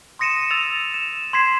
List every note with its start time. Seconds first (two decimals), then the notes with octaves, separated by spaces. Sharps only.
0.19 C6 D#6 A#6 C#7 D#7 E7
0.50 E6 A6 F7
0.94 E7
1.33 C6 G#6 B6 C7 E7